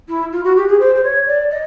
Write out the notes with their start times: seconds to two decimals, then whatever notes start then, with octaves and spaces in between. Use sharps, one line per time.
0.08 E4
0.32 F4
0.44 F#4
0.56 G4
0.68 G#4
0.79 C5
0.95 C5
1.03 C#5
1.27 D5
1.51 D#5